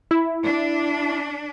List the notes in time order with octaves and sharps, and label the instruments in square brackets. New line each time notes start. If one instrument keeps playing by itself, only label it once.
[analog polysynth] E4
[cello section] D4